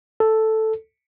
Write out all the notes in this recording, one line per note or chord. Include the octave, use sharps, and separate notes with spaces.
A4